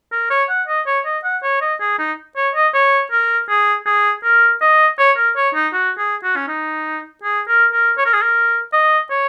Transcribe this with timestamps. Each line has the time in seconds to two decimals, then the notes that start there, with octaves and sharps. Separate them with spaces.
0.12 A#4
0.30 C#5
0.49 F#5
0.68 D#5
0.87 C#5
1.05 D#5
1.24 F#5
1.43 C#5
1.61 D#5
1.81 G#4
1.99 D#4
2.37 C#5
2.55 D#5
2.74 C#5
3.12 A#4
3.49 G#4
3.86 G#4
4.24 A#4
4.61 D#5
4.99 C#5
5.17 A#4
5.36 C#5
5.55 D#4
5.73 F#4
5.98 G#4
6.23 F#4
6.36 C#4
6.48 D#4
7.23 G#4
7.48 A#4
7.73 A#4
7.98 C#5
8.06 A#4
8.13 G#4
8.21 A#4
8.73 D#5
9.10 C#5